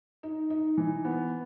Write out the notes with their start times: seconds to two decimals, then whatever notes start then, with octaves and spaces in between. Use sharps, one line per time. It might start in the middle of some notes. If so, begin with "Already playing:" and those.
0.23 D#4
0.50 D#4
0.78 E3
1.05 B3